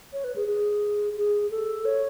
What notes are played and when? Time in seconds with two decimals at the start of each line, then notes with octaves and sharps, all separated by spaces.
0.13 C#5
0.24 B4
0.36 G#4
0.48 G#4
1.16 G#4
1.51 A4
1.85 C#5